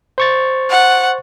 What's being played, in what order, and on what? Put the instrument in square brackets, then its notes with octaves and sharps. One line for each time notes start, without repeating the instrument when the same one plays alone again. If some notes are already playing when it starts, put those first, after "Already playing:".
[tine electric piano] C5 C#6 A6
[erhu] F#5